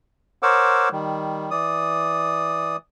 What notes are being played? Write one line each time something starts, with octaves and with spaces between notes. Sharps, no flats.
A#4 C5 C#5 F#5 D6 E6
D#3 G3
E3 D5 D#6